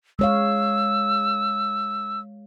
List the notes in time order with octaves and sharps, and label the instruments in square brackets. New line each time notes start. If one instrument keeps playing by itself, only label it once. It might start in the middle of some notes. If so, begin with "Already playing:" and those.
[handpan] G#3 C#5 F5 [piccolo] E6